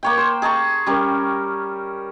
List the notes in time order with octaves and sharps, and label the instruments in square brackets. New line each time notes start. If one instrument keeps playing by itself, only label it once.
[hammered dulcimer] A#3 C#5 G5
C5
G#4 A5 A#5 C#6
G3 C#4 A#4